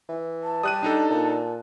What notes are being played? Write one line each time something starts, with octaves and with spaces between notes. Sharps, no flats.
E3
A5
G3 D#6 F#6 D#7
D4 D#4 A4
A#2